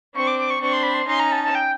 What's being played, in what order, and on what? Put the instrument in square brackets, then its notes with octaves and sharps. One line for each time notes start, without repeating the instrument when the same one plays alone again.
[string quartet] C4 D4 [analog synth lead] C#6
[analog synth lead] D6
D6
C#6
[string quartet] C4 D4 [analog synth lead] C#6
[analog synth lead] C6
B5
C6
[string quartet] C#4 D#4 [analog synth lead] C6
[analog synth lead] A#5
A5
A5
G5